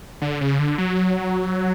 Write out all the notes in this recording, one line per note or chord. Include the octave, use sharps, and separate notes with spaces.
D3
C#3
D3
F#3